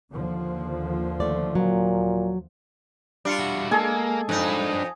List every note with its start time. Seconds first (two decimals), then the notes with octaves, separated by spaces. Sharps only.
0.12 D#2 D3 F3
1.20 A3 D5
1.55 A#2 F#3
3.25 G3 D4 F4 F5 C#7
3.39 E4 F#4
3.71 G#3 A#3 G#4 A4 G#5 A5
4.29 F2 D4 D#4 B4